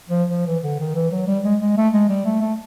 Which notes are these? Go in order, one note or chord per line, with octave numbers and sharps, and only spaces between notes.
F3
F3
E3
D3
D#3
E3
F#3
G3
G#3
G#3
A3
G#3
G3
A3
A3